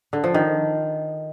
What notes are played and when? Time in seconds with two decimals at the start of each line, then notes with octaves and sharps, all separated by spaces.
0.13 D3
0.24 F3
0.34 D#3